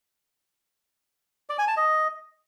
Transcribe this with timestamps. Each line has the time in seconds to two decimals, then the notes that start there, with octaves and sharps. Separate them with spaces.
1.49 D5
1.59 G#5
1.68 A5
1.77 D#5